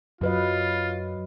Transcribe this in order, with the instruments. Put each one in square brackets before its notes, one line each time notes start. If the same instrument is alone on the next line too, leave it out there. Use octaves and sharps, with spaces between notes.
[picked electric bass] F#2 [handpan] F#3 B4 D#5 [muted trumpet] F4